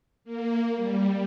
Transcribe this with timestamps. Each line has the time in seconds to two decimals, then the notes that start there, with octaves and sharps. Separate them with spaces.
0.24 A#3
0.76 G3